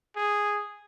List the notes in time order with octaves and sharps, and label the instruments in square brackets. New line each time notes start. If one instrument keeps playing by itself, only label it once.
[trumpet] G#4